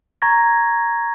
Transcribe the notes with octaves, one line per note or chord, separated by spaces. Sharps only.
A#5 C#6 G#6 A#6